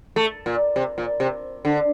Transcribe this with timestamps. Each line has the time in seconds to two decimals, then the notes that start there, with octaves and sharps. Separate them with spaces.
0.16 A3
0.46 A#2
0.76 C3
0.98 A#2
1.20 C3
1.65 D3